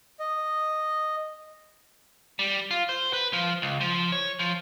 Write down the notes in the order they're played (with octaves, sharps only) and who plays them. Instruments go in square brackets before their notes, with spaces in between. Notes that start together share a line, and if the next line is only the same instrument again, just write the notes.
[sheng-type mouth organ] D#5
[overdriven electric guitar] G3
F4
C5
B4
F3
C#2
F3
C#5
F3